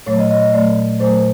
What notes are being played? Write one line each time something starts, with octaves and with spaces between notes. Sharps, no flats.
A#2 F#3 A3 C#5
D#5
D#5
D#5
A#2 F#3 A3 D5
A#2 F#3 A3 C5